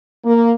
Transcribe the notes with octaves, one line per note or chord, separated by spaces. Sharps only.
A#3